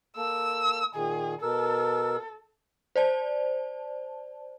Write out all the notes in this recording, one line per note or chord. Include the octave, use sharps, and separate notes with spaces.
A#3 A4 E6
A#2 D#3 G#4
B2 A4 A#4 E6
C5 D5 A5